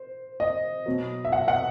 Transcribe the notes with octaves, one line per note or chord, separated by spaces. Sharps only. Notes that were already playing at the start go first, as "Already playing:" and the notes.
Already playing: C5
D#5
B2 F#3
E5
F#5
F#5